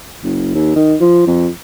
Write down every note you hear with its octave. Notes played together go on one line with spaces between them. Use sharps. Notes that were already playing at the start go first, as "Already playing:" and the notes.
F#1
D#2
D#3
F3
F2